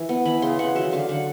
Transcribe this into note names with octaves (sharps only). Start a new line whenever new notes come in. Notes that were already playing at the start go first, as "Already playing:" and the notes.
Already playing: E3
B3
E3 B5
C#3 C6
C#3 F#5
F#3 E5
D3 F5
D3 F#5